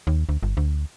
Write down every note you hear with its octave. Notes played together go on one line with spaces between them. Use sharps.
D#2
D2
G1
D2